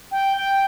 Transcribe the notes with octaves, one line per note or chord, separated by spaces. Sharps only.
G5
G5